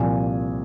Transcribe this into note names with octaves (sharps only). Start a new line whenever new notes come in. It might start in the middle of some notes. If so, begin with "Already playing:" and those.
Already playing: C2 A#2 F3 G#5